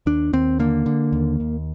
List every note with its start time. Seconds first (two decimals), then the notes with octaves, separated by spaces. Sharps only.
0.06 D#2 D4
0.33 D#2 C4
0.59 D3 A#3
0.86 D3
1.13 D#2
1.40 D#2